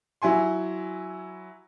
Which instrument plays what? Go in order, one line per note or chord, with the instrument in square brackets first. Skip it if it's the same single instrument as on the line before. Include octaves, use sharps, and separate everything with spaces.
[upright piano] F#3 E4 G#5 C6